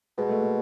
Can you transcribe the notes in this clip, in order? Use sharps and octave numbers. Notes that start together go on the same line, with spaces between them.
B2 G#3
A3
A#3